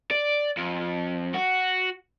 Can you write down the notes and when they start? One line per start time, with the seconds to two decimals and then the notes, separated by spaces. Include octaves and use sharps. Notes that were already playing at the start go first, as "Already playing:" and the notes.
0.11 D5
0.57 F2
1.34 F#4